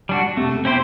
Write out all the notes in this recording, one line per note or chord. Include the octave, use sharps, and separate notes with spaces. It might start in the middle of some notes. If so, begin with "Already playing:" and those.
G3 D4 F#4
C3 A3
B2
C4 E4 G4 C5